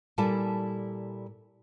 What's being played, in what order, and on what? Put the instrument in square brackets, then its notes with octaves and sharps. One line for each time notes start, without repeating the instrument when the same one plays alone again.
[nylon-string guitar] A#2 G3 E4 A4 G#5 A5